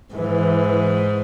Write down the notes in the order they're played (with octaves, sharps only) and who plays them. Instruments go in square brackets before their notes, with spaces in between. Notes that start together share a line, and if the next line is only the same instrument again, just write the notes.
[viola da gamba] G#2 [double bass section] E3